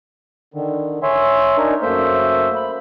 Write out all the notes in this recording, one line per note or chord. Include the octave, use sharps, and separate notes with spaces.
D3 D#3
C#5 E5 G#5 C6
D4 D#4 A#4 G#5
F#2 A3 A#3 C5 E5
B5